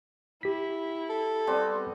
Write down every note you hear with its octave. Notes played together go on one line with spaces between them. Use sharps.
E4 G4 B6
A4
G3 B3 C4